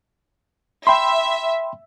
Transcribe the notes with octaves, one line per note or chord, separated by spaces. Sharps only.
E5 G5 B5 C6